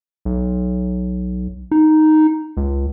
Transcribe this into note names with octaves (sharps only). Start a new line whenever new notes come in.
B1
D#4
C#2